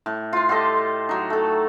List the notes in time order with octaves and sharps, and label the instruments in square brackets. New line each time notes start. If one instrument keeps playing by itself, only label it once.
[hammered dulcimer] A2
F4 C6
F4 G4 A4 D#5
F#3 D#4
A3 A4